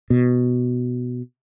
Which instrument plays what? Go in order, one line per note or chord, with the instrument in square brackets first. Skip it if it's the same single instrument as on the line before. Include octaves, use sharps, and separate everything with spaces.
[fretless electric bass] B2